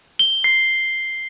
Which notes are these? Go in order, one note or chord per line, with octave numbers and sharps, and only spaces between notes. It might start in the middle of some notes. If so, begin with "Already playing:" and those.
G7
C7